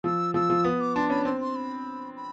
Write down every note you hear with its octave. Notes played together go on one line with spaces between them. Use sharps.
F3 E6
F3 E6
F3
B3 D#6
D6
D4 C6
C#4 B5
C4 C6
C6
B5
B5